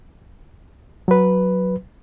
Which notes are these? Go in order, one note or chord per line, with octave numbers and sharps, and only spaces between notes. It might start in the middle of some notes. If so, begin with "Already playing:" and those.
F#3 B4